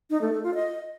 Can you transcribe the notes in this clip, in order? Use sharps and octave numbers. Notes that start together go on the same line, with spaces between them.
D#4
A3
A4
F4
D#5